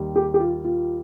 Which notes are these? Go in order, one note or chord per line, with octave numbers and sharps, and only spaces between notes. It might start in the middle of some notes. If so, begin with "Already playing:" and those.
Already playing: D#2 D#3 G3
G4
G4
F4
F4